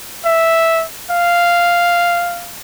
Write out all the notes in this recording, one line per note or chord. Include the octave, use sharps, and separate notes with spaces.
E5
F5